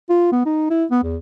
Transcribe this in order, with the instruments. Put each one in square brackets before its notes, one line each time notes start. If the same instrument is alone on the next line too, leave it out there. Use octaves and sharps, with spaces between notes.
[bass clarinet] F4
B3
D#4
E4
B3
E2